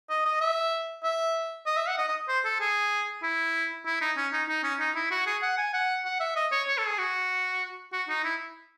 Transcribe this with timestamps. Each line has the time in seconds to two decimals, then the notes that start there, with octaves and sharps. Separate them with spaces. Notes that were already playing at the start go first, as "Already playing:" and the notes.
0.10 D#5
0.25 D#5
0.41 E5
1.04 E5
1.66 D#5
1.77 E5
1.87 F#5
1.98 D#5
2.08 D#5
2.29 C5
2.45 A4
2.60 G#4
3.23 E4
3.86 E4
4.01 D#4
4.17 C#4
4.33 D#4
4.48 D#4
4.63 C#4
4.79 D#4
4.95 E4
5.11 F#4
5.26 G#4
5.42 F#5
5.58 G#5
5.74 F#5
6.05 F#5
6.20 E5
6.36 D#5
6.52 C#5
6.68 C#5
6.78 A4
6.88 G#4
6.98 F#4
7.93 F#4
8.09 D#4
8.24 E4